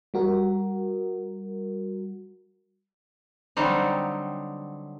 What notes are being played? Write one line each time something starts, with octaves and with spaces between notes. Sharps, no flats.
G3 F#4 A#4
D3 F#3 G3 C4 D#4